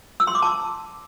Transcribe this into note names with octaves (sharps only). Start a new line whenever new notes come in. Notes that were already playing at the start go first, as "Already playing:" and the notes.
E6
C6
D6
A5